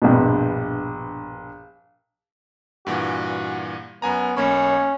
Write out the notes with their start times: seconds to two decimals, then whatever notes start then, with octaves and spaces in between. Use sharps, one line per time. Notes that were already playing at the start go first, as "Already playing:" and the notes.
0.02 A#1 G2 B2
2.87 G2 A#2 E3 F#4
4.02 F#2 B3 G#5 A#5
4.37 B1 A#3 C#4 C#5 B5